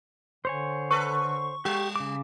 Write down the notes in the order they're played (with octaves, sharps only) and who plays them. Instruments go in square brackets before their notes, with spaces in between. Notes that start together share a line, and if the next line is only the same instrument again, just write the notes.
[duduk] D3 [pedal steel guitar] C5 C#5 G#5
[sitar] A4 B4 [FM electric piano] C#6
[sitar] G3 [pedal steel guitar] G4
[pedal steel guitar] C#3 D6